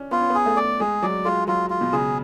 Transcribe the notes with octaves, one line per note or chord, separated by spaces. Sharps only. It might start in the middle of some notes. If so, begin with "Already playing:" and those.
Already playing: C#4 D4
B3 F4
C#4
B3 G#4
A3
D5
G#3 G#4
F#3 D5
G#3 F4
F#3 F4
F4
B2
C#3 G#4